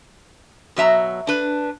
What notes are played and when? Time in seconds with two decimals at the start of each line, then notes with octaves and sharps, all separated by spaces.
0.76 B2 F#3 E5 A#5
1.27 D4 B4